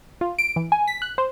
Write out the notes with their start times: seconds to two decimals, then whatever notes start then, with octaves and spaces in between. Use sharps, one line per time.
0.21 F4
0.39 D7
0.56 E3
0.72 G#5
0.88 B6
1.02 F#6
1.18 C5